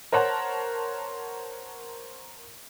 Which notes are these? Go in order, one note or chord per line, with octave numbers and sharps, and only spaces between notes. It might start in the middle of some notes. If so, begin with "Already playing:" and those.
A#4 C5 C#5 F#5 A5